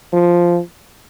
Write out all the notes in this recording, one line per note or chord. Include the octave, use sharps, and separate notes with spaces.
F3